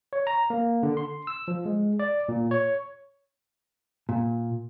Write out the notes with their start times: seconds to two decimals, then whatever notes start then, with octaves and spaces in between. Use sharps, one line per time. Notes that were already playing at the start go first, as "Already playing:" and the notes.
0.13 C#5
0.27 A#5
0.50 A#3
0.83 D3
0.97 C6
1.27 E6
1.48 F3
1.65 G#3
1.99 D5
2.29 A#2
2.51 C#5
4.09 A#2